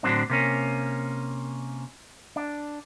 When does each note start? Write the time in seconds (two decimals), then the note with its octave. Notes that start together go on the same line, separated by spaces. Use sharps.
0.03 A2 D3 E3 F#3 C4 D4
0.30 C3 A#3 C#4
2.36 D4